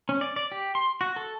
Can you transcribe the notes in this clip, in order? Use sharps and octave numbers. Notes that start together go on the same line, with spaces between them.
C#4
D5
D5
G4
C6
F#4
A4